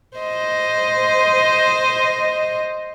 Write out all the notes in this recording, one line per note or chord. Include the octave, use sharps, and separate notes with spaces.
C5 D#5